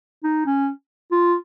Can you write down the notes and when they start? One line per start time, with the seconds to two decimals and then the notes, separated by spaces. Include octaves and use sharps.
0.23 D#4
0.46 C#4
1.12 F4